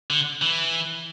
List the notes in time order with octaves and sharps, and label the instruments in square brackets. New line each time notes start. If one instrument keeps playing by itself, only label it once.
[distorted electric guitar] D3
E3